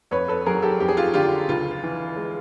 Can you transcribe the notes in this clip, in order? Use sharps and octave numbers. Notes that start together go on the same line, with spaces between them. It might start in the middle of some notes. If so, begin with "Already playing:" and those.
F2 B4 C#5
A4 B4
F#3 G#4 A#4
G4 A4
F2 G4
G#4
F4 G4
D3 F4 G4
C#2 F4
E3
G#3